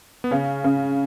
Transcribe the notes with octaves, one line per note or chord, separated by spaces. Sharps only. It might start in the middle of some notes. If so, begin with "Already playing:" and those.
B3
C#3 C#4
C#3